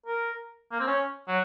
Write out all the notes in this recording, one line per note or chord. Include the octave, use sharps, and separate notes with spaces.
A#4
A#3
C4
C#4
F#3